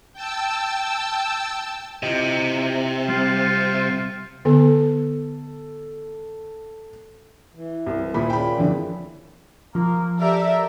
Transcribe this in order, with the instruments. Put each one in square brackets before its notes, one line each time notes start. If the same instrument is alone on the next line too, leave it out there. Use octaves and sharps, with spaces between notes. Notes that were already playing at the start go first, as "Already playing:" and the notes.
[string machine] G5 A5 E6
[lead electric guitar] C3 [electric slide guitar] E4 F4 D#5
[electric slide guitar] G3 C4 [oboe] F4
[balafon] D3 B3 [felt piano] A4
[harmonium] E3
[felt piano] C2
[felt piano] D#1 A#2 B5 [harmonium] E4 G#4
[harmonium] A#2 C#3 [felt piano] G5 B5
[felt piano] F2 D3 E3
[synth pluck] F3 [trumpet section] A#3 A#4
[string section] G4 A#4 D5 [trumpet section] A4 E5